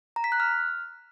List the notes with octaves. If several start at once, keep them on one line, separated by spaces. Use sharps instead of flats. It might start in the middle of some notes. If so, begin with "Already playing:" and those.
A#5
B6
F#6
F6